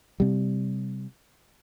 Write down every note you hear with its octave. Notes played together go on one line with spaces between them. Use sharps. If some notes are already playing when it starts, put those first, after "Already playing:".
C3 G3